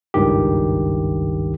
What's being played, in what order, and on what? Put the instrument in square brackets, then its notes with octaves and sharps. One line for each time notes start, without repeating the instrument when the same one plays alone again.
[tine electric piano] G#1 C#2 G2 D#3 G4